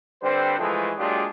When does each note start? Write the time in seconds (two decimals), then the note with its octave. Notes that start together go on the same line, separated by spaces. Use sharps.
0.23 D3 G3 C4 B4 C5
0.59 E3 F3 G#3 A3
0.98 A#2 F#3 G#3 D4 F4 G4